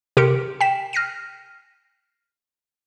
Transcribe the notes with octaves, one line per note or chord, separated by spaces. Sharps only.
C3 G4 A#4 C6 C#7 D7
G5 B6 E7
F6 A#6 C7 D#7